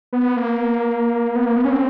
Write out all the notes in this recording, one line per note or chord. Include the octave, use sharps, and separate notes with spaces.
B3
A#3
B3
A#3
B3
C#4
C4